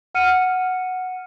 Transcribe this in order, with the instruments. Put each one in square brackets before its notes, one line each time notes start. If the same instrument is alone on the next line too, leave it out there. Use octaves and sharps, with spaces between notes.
[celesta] F#5 F6 C#7 D#7